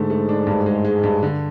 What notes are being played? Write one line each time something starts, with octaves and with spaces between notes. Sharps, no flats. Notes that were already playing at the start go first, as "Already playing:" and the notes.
Already playing: G#2 D3 A3
A3
D4
G2
G#3
G#3
G2
D3